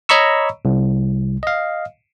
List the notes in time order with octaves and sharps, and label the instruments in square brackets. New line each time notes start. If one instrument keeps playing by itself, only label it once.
[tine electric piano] C#5 D#5 A#5 B5 C#6 E6
C2
D#5 F5